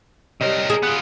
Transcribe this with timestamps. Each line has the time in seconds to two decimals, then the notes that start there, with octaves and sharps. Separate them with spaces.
0.41 C3 G3 A#4 C#5 D#5
0.70 G#4
0.83 B3 F4 D#6 F#6